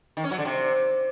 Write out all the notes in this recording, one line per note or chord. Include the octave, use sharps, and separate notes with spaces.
D#3
C#4
F#3
D3
C3